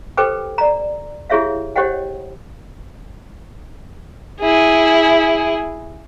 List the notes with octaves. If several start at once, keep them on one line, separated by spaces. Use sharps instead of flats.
G4 A4 B4 C5 G5 D6
D5 A#5
E4 G4 G#4 C#5 E5 F5
G4 C5 C#5 D#5 F#5 G5
E4 G#4